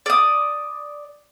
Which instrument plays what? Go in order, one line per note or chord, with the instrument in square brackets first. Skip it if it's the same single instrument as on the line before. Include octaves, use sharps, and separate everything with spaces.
[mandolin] D5 D#6